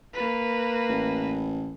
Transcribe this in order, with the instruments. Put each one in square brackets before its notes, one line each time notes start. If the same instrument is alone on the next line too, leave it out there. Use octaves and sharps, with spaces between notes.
[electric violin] A#3 B4
[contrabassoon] A1